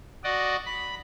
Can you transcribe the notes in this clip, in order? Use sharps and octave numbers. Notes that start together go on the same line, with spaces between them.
F#4 D5 D#5
B5